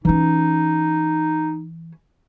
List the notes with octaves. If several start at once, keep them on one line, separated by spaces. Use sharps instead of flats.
E3 C#4 D#4